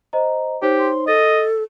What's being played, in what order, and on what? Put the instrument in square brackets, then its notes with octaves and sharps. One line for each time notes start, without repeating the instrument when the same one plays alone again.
[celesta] C5 D#5 A#5
[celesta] D#4 C5 C#5 [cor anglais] G4
[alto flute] C6
[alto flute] A4 [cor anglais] D#5 [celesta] A6